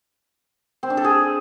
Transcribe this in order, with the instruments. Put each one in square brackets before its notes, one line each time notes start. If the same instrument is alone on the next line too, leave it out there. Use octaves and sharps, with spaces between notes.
[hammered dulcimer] C4
D4
A4
G#4